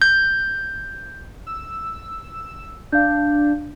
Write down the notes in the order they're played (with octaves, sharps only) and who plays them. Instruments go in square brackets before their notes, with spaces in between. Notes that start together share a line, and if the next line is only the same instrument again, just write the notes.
[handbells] G6
[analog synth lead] E6
[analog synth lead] D4 [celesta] F5 G6